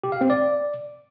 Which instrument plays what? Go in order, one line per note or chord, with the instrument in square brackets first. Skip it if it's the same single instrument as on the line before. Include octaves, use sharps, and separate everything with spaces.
[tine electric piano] G4
F5
C4
D5